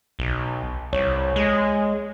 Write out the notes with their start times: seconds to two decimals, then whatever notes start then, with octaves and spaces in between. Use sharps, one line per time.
0.19 B1
0.93 C2 C#5
1.36 G#3